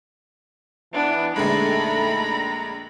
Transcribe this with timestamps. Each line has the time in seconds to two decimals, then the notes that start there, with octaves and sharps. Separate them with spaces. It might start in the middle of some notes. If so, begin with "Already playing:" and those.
0.93 E3 B3 D4
1.36 A#1 D3 G#3 A3 D#4 A4 A#5 B5